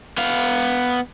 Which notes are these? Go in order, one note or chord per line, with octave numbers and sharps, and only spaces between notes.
B3 F5